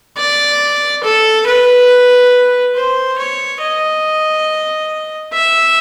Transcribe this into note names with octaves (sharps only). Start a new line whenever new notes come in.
D5
A4
B4
C5
C#5
D#5
E5